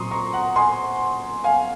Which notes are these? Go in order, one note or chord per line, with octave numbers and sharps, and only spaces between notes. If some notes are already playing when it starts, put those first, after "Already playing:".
Already playing: A#2 F#3 C4 A#5 C6 C#6 D#6
A#5 C#6
F#5 A#5
G#5 C6
F5 G#5